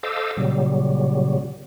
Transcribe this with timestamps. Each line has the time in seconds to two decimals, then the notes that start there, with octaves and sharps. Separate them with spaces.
0.03 A4 C5 D#5 F5 D6 E6
0.37 A#2 C#3 F#3 G3